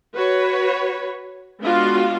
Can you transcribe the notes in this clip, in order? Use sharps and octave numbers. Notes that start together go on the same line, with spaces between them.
F#4 B4 C#5
G#3 B3 D4 F4 F#4 F5